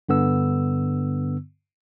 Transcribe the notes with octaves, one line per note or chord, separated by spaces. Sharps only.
G2 D3 B3 E6